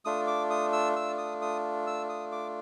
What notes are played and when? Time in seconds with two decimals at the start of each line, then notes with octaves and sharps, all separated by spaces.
0.05 A3 D4 F4 D#6
0.27 D6
0.50 D#6
0.73 E6
0.96 E6
1.18 D#6
1.42 D#6
1.87 E6
2.09 D#6
2.32 D6